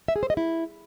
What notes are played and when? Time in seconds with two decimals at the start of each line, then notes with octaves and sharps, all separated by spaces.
0.08 E5
0.16 G#4
0.23 C5
0.30 D#5
0.37 E4